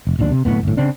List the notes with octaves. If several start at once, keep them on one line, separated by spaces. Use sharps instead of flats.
F1
D1 A#1 D#2 D4
C3
D1 F2 A2 B3
G1 A2
C#3 C4 D4